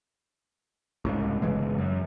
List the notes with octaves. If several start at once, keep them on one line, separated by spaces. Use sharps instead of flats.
C2 G#2 C#3
G1 C#3 E3 G#3
F#2